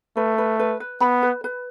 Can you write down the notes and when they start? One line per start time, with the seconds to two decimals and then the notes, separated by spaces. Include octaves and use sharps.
0.17 A3 B4
0.38 B4
0.59 B4
0.80 B4
1.01 B3 B5
1.23 B4
1.44 B4